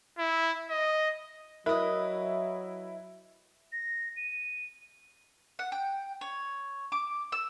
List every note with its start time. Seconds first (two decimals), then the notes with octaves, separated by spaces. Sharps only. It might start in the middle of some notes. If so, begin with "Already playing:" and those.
0.19 E4
0.70 D#5
1.66 F#3 E4 A#4 B4 D#5
3.72 A#6
4.16 D#7
5.59 F#5
5.72 G5
6.21 C#5
6.92 D6
7.32 E6